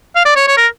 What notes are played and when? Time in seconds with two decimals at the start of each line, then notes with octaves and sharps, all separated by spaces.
0.16 F5
0.25 D5
0.36 C#5
0.48 C#5
0.57 A#4